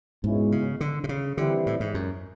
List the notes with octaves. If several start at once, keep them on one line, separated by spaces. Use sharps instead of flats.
G#2 B2 G#3 C#4 E4
C#3
D3
C3
C#3
D3 E3 G3 C4 E4 G4
A2
G#2
F#2